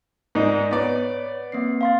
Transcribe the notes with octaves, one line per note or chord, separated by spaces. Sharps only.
G#2 D#4 A#4 D5
B3 C#5 D5
A#3 C4 C7
F5 C6 A6